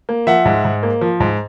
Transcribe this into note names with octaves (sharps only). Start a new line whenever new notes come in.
A#3
F3 E5 F#5
G#2
G#2
A#3
F3
G#2